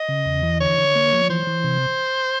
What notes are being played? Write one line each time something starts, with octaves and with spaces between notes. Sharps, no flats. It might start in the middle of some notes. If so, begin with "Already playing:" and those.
Already playing: D#5
C#3
E2
E3
D3 C#5
D3
A#3
F3
E3 C5
E3
C3